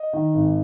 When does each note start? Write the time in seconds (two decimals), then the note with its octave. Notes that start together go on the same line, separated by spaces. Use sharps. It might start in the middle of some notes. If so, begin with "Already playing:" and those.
Already playing: D#5
0.13 D#3
0.34 G#1